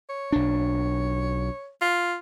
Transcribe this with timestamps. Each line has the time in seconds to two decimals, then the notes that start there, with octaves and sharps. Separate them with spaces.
0.10 C#5
0.32 B1 D4
1.81 F4